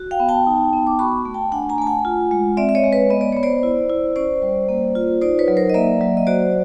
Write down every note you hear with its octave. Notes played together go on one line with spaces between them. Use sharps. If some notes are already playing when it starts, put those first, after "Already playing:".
Already playing: F#4
F5 G5
B3
G5 A5
D#4
B3
D6
F#4 B5 C#6
A3
G5 A5
D4 F#5 G#5
G#5 A#5
A3 A5
F#5 G#5
F4
G#3
C4 D5 E5
E5
C#5 D#5
G#3
B4 C#5
B3 D#5
D5
B3 C#5
C5 D5
E4
E4
C#4 C5 D5
G3
A#3
F4
D#4 C5 D5
B4 C#5
F#3
A#4 C5
D#5
A#3 D5 E5
F#3
D#5
F#4 C5 D5